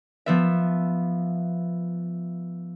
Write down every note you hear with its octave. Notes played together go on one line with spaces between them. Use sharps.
F3 B3 E5